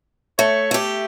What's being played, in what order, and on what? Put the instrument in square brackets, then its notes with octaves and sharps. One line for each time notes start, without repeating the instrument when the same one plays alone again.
[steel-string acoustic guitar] A3 [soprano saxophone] C#5
[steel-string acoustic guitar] A3 G4